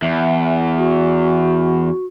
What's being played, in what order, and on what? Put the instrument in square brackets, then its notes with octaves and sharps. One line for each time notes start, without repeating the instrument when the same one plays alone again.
[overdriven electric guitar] E2 [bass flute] E5
[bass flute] F#4